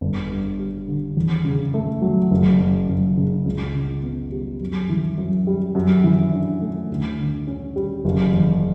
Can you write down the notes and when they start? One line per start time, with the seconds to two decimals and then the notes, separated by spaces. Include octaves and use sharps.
0.01 G1
0.30 G2
0.59 G3
0.88 D3
1.17 E2
1.45 C#3
1.74 A3
2.02 F#3
2.31 F#1
2.60 F#2
2.88 F#1
3.17 C#3
3.46 C#2
3.74 C#3
4.03 B3
4.32 G3
4.61 F#2
4.90 E3
5.18 F#2
5.47 G3
5.75 F#2
6.04 E3
6.32 D4
6.61 A3
6.90 D2
7.19 D3
7.47 C#4
7.76 G3
8.05 F#1
8.33 E2